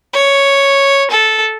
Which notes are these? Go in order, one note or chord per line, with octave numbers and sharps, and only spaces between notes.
C#5
A4